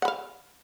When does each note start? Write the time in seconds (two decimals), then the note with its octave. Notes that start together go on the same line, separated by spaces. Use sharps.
0.02 F#5
0.05 B5
0.08 F5